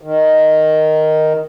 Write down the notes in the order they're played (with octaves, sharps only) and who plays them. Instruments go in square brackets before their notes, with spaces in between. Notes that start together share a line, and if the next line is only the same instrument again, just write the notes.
[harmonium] D#3